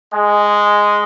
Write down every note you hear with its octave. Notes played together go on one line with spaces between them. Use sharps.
G#3